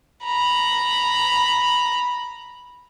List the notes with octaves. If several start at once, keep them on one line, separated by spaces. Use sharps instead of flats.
A#5 B5